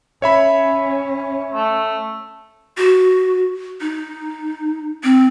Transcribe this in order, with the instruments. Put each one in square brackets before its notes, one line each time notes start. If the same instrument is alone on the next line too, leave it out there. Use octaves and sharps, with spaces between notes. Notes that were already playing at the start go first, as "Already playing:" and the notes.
[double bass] C#4 [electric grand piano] C#5 E5 B5
[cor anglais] A3
[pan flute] F#4
D#4
C4